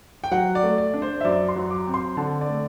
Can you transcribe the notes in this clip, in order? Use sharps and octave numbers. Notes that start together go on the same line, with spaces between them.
G5
F#3 F#5
D5
A3
D5
D4
C5
E5
F#2 D5
C6
F#3
D6
C4
C6
D3 A5
D5
A3